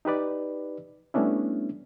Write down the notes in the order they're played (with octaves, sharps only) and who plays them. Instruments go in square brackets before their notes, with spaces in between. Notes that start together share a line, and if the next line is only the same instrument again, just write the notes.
[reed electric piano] D#4 G4 B4 D5
G3 A3 B3 C#4 D4 E4